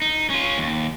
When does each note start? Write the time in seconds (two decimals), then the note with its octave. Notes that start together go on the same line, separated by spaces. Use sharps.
0.02 D#4
0.30 C#4 F4
0.58 D#2